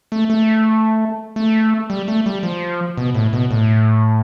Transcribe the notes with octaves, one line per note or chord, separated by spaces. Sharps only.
A3
A3
A3
G3
A3
G3
F3
B2
A2
B2
A2